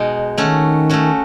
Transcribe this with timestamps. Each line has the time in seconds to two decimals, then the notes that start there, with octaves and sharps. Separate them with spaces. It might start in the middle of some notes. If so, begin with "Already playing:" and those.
Already playing: B2 G#3 D#4
0.38 D#3 A3 C#4 F#4
0.90 A3 C#4 F#4